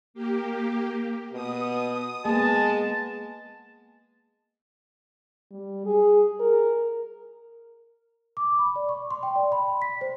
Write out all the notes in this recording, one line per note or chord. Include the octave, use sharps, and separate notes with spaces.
A#3 G4
B2 D#6
G#3 A#3 B3 A5
G3
G#4
A#4
D6
B5
D5
C#6
C6
G5
D5
B5
B6
C5